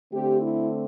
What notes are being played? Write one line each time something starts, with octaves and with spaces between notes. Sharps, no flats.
D3 A3 C4 G4
E4